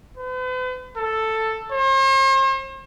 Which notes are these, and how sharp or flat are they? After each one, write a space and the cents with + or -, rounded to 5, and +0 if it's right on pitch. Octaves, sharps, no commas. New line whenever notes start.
B4 +45
A4 +5
C5 +45